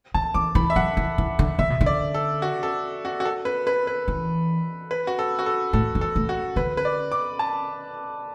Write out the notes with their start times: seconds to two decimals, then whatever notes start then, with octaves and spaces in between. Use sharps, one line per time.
0.14 D3 A5
0.34 E3 D6
0.55 E3 B5
0.70 E5
0.76 F#3 F#5
0.97 E3
1.18 E3
1.39 D3
1.59 D3 E5
1.70 B2
1.81 D3
1.86 D5
2.14 A4
2.42 F#4
2.63 A4
3.05 F#4
3.20 F#4
3.25 A4
3.45 B4
3.67 B4
3.87 B4
4.08 E3
4.91 B4
5.07 F#4
5.19 A4
5.39 F#4
5.46 A4
5.73 A2 A4
5.95 F#2
6.01 A4
6.16 A2
6.29 F#4
6.56 D3 B4
6.77 B4
6.85 D5
7.12 D6
7.39 A5